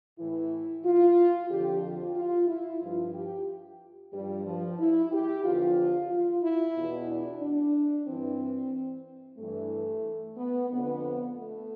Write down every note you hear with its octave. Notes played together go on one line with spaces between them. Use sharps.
A2 E3 E4
F4
F2 D3 F3 G4
F4
F4
E4
G2 F3 F4
G4
G2 F3 G3
F3
E4
G4
E2 D3 F3 F4
F4
E4
E2 B2
D4
D4
G2 E3 C4
G2 E3 A3
B3
F2 D3 F3 B3
A3